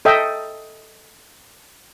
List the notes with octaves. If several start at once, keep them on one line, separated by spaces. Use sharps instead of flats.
A4 D#5 E5 G5